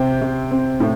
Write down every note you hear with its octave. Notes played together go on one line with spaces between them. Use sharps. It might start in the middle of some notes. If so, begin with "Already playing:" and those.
Already playing: C3 C4 G5
C3
C4
A2